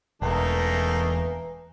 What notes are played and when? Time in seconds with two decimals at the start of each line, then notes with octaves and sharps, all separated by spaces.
0.22 E1 E3 A3 A#3 D#4